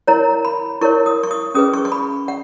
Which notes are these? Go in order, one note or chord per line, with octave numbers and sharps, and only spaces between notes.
E4 A#4 C#5 A#5
B5
E4 A#4 C#5 C#6
D#6
C#6
D#6
C#4 G#4 B4 D#6
C#6
C#6
B5
F#5